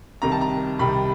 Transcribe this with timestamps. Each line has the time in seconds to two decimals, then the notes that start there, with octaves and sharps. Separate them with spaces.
0.22 C2 C3 D#3 G3 A#5
0.32 A5
0.41 A#5
0.79 C2 C3 D#3 G3 B5